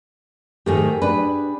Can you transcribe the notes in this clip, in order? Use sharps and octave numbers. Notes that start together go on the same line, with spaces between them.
G#2 D#3 A3 G4 G#4
D4 B4